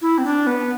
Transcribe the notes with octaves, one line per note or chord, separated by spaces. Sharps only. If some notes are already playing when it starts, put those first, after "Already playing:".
E4
C4
D4
B3